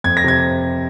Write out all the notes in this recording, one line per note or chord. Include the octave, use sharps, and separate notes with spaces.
F2 G#6
A#6
C3 G#6